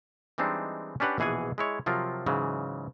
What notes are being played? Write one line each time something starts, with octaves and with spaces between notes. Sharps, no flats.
E3 G3 G#3 C4 D4 D#4
C#4 D4 G4 B4 F#5
A#1 B2 E3 G#4 F#5 G#5
G#3 E4 C#5
C3 F3 F#3 F4 A#4
G#2 C#3 E3 F#3